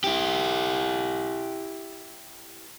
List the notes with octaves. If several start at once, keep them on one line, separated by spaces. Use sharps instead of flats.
E4 G4